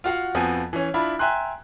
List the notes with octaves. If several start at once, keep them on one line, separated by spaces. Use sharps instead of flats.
F4 F#4 F5 F#5
F2 F3 B3 F#4 G#5
E3 C#4
D4 E4 F4 B5
E5 G5 G#5 A#5 C6 F#6